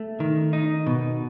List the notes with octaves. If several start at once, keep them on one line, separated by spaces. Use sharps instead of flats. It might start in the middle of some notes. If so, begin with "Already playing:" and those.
Already playing: A3
D#3
D#4
B2